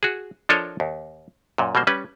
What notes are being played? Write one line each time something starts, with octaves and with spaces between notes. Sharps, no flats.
F#4 G#4
F3 D4 A4 A#4 C#5 D#5
D#2
F#2 A#2
B2 G3 A#3 C5
G3 C#4 B4